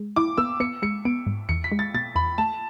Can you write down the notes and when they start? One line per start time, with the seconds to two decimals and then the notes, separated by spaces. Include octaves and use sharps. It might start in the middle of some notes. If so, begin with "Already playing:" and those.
Already playing: G#3
0.16 E4 D6
0.37 B3 E6
0.60 B3 C#7
0.82 G#3 C#7
1.05 B3 D7
1.27 G#2
1.49 E2 C#7
1.64 B6
1.72 G#3
1.79 A6
1.94 B2 A6
2.16 E2 B5
2.38 A3 A5